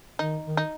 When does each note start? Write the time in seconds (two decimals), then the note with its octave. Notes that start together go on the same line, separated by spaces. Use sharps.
0.19 D#3 D#4
0.45 D#3
0.57 D#4